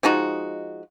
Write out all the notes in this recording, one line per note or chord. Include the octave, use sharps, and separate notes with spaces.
F3 G#3 D#4 F#4